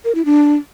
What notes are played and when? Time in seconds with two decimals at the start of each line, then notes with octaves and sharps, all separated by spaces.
0.05 A#4
0.15 E4
0.25 D4